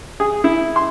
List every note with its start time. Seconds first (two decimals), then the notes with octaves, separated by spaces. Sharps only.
0.20 G#4
0.44 E4
0.76 C6